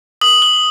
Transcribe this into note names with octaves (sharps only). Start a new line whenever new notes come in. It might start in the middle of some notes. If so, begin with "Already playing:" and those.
D#6 F#7
G7